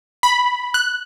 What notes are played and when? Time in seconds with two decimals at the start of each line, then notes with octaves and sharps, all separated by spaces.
0.23 B5
0.74 F#6